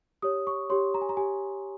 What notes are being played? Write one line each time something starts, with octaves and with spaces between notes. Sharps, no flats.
G4 C#5 D#6
C#6
G4 C#5 C6
A#5
G#5
A#5
G4 G#5